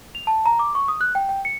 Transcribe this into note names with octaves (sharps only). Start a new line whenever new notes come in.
F7
A5
A#5
D6
C#6
D#6
F#6
G5
G5
C#7